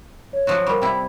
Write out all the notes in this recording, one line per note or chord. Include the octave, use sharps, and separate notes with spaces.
C#5
F3 F#3 F#4
G3 A#4 C#6
C3 E4 G5